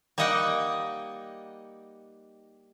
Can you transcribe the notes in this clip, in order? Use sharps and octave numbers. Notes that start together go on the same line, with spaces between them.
G3 A#3 D#4 D#5 F#5 G5